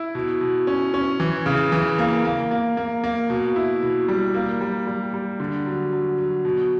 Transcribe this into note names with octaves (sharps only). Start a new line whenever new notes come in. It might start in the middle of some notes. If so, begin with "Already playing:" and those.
Already playing: E4
B2
B2
C#4
C#4
E3
C#3
E3
A#3
A#3
A#3
A#3
A#3
B2
E4
B2
G3
A#3
G3
G3
G3
D3
F#3
F#3
F#3
B2